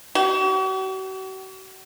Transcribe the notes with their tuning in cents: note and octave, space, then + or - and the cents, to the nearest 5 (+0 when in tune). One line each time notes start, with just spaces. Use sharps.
F#4 +45